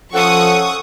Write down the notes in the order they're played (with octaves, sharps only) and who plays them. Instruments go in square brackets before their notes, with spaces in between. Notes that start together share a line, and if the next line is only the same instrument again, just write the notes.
[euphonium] F3 [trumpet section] C#4 F#5 [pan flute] A4 [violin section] C#6 D#6